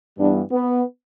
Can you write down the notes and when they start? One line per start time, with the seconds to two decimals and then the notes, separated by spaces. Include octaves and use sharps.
0.19 G2 E3 G3 B3 D4
0.52 B3